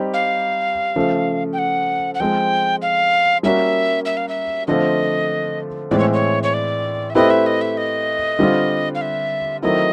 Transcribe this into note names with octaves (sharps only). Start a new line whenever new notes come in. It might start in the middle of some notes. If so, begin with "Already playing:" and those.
Already playing: G3 C4 D#4 G4
F5
C#3 F3 A3
G5
F#5
F#5
F3 G#3 C4 G5
F5
G3 A#3 C#4 F#4 E5
E5
F5
E5
D3 F3 A3 C4 F4 D#5
A2 E3 G#3 C4 D5
C#5
C#5
C#5
D5
E5
A3 C4 E4 G4 B4 D#5
E5
D#5
E5
D#5
D3 G3 C4 F4
F5
E5
D#3 F#3 A3 C4 E4 D#5